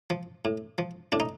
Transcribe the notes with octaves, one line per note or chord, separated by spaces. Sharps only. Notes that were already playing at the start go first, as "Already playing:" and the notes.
F3
A2
F3
A2 D4
D#4